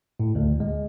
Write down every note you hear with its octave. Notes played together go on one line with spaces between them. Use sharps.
A2
D2
G#3